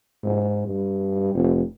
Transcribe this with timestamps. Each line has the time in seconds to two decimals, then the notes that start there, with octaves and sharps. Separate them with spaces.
0.23 G#2
0.66 G2
1.34 F1